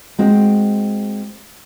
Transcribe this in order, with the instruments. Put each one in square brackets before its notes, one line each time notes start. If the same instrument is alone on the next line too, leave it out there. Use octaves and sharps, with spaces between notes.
[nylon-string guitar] G#3 C4 F#4